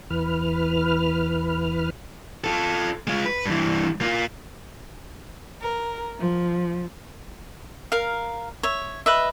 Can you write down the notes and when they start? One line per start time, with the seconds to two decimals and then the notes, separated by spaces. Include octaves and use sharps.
0.10 E2 E3 B4 F6
2.44 F4 A4
3.07 G#3 F4
3.25 B4
3.45 G2 E3
4.01 A#3 F4
5.61 A#4
6.19 F3
7.92 A#4 F5
8.63 C#5 E5
9.06 B4 D#5 E5